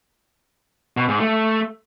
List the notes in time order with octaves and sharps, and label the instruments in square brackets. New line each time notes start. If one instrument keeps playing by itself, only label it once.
[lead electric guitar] B2
G#2
A3